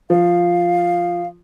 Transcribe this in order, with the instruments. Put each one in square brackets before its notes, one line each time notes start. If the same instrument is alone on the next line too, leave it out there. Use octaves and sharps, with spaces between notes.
[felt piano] F3 [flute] F5